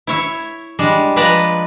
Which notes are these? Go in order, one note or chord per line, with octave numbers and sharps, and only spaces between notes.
E4 C#5 E5
G3 G#3 D4
F3 G#3 B4 D5 A5 A#5